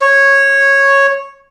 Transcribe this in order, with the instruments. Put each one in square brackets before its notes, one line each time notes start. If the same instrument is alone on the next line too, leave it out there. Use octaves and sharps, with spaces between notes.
[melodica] C#5